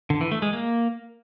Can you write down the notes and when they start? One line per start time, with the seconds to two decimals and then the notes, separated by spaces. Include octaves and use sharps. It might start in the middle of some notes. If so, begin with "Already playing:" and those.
0.10 D3
0.21 E3
0.32 A3
0.42 G#3
0.53 A#3